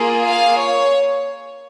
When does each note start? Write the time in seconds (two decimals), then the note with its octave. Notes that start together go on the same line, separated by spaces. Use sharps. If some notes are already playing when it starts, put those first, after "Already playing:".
Already playing: A#3 F4 G#4
0.25 F5
0.59 C#5